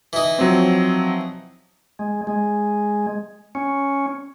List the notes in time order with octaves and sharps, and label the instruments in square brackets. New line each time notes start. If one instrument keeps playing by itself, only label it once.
[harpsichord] E3 D#4
[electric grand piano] F3 F#3 C4
[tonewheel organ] G#3
G#3
C#4